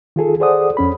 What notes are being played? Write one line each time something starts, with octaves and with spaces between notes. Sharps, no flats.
D#3 F4 G#4 A4
G#4 A4 C5 D5 F#5 D#6
F2 C#4 B5